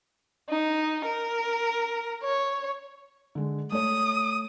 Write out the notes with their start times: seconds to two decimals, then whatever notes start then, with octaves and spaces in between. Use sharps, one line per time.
0.49 D#4
1.05 A#4
2.23 C#5
3.35 D3 G#3
3.72 A3 C#5 D#6